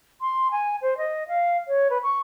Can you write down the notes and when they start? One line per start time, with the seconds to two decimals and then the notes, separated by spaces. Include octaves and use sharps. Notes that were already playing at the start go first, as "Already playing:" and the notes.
0.21 C6
0.51 G#5
0.82 C5
0.98 D#5
1.28 F5
1.68 C#5
1.90 B4
2.03 C#6